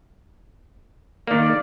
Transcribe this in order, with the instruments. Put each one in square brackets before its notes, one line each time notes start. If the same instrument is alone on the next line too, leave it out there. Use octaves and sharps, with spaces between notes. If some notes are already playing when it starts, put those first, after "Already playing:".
[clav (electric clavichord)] D#3 A#3 [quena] D5